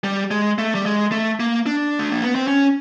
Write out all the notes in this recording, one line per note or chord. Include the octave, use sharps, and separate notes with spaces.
G3
G#3
A3
G3
G#3
A3
A#3
D4
A3
A#3
B3
C4
C#4